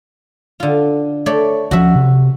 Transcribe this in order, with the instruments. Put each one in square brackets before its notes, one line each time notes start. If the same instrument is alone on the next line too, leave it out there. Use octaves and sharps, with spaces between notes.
[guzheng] D3 F4
A3 C#5 D5
[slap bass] D2 F3 C#4 [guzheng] F#4 E5
[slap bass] C3